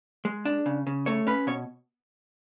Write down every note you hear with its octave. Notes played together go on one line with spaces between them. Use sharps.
G#3
D4
C#3
C#3
A3 C#5
C#4 B4
B2 C#5